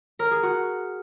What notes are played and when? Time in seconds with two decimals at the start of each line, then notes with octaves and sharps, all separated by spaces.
0.19 A#4
0.31 G#4
0.43 F#4